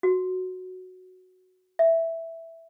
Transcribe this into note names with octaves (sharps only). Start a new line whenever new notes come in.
F#4
E5